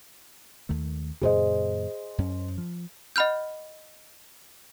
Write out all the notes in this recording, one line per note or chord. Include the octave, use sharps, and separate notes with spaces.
D#2 D#3 A3
F#2 A#2 C#3 G#4 C5 D#5
F#2 C#4
F3
D#5 F#5 B5 F6 G6